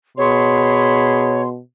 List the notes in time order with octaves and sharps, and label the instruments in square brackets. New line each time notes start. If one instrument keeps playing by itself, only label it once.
[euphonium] B2 [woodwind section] G#4 B5 C6 [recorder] C#5